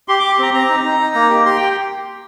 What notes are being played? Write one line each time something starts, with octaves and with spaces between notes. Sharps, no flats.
G4 C6
G4 D6
C6
C4 A#5
C4 A#5
D#4
D#4
D#4
A#3
G4
G4 C6
G4 G5